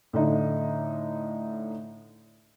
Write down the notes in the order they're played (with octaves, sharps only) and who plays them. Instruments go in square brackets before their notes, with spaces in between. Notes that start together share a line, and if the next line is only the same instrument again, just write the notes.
[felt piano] A2 D3 D#4